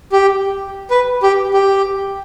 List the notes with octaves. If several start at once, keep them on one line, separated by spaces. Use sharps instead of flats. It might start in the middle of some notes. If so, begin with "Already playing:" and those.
G4
B4
G4
G4